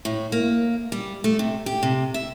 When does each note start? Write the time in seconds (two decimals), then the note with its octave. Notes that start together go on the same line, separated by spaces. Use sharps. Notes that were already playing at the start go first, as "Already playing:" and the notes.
0.05 A2
0.32 A#3
0.92 G3
1.24 A3
1.39 C3
1.66 G4
1.83 C3
2.14 E5